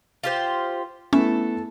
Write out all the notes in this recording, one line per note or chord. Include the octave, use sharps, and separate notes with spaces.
F4 G4 C5
A3 B3 C#4 E4 A4